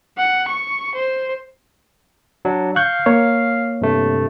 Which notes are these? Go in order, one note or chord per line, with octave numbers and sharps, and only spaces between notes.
F#5
C#6
C5
F#3 D4
F5 C#6 F#6 G6
A#3 C#5
G2 C3 A3